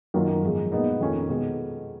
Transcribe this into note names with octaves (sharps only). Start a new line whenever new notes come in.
F#2 D#3 F#3 A#3 F4
G#2 F3 G#3
A#2 G#3 B3 D#4
F2 D#3 A#3 C#4 F4
B2 G#3 B3 D#4